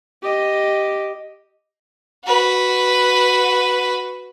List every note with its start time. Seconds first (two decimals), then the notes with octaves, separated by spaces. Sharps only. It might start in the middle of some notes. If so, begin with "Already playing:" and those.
0.22 G4 D#5
2.26 F#4 B4